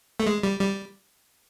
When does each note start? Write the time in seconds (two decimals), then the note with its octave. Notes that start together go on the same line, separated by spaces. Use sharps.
0.20 A3
0.26 G#3
0.43 G3
0.61 G3